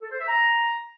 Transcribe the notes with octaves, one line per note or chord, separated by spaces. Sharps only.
A4
C5
E5
A#5